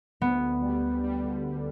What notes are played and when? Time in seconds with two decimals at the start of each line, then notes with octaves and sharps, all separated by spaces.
0.21 D2 B3
0.42 D2
0.62 G3
0.83 G3
1.04 G3
1.24 D3
1.44 G3